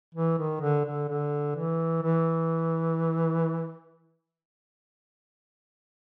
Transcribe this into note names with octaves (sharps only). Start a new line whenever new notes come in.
E3
D#3
D3
D3
D3
E3
E3